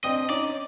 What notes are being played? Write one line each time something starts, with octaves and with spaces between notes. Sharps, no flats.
C4 D4 D#5
C#4 D#4 D5